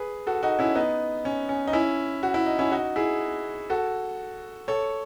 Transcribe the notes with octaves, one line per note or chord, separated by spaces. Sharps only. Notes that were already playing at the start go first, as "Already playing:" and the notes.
Already playing: G#4 B4
F#4 A4
D#4 F#4
C#4 E4
B3 D#4
C#4
C#4
D#4
C#4 E4
F#4
E4
D#4
C#4 E4
D#4 F#4
E4 G#4
F#4 A4
A4 C#5